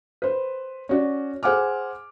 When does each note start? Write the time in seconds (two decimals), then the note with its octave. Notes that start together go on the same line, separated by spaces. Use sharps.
0.22 B4 C5
0.89 C#4 F#4 D5
1.43 G#4 C5 F#5 G#5 D6 F6